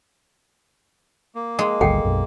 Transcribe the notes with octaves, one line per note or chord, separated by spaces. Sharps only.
A#3
G#3
G#1 D2 G3 A4 F#5 G5
B1 F#2